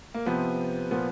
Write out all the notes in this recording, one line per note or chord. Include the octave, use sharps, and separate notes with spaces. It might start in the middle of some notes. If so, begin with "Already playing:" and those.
A#3
C3 F3 B3
A#2 F3 B3